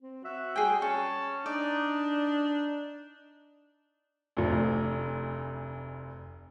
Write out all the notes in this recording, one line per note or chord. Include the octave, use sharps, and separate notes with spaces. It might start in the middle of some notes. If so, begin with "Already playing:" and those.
C4
F#4 E5
G3 G#4 G5
C#4 A5 C#6
D4 D#4 D5
F1 D2